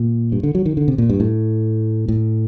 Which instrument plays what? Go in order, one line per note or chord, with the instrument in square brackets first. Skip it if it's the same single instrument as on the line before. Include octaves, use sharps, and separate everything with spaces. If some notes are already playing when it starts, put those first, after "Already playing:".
Already playing: [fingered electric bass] A#2
G2
D3
F#3
D#3
D3
C3
A#2
G2
A2
A2